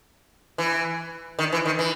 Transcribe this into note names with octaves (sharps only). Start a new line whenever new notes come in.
E3
D#3
E3
D#3
E3